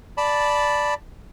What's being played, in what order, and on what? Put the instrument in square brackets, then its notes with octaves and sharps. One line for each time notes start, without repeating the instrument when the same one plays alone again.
[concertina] D5 A5 B5